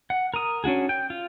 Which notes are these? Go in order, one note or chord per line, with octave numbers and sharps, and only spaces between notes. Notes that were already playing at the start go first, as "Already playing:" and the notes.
F#5
A#4 D#6
C#4 D4 F#4 G#4
G5
F4